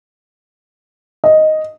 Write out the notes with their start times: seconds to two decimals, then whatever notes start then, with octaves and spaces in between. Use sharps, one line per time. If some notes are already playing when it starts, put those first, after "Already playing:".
1.24 D#5